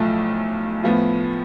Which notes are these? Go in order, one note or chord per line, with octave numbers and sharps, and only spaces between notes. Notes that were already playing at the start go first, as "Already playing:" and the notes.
Already playing: B1 A2 F3 A3
A2 F3 B3 F4